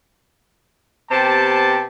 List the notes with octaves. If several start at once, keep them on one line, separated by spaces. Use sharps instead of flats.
C3 B3 G4 C5 A5